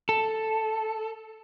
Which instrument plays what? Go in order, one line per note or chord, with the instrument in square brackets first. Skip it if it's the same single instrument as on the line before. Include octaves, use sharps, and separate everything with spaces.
[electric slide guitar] A4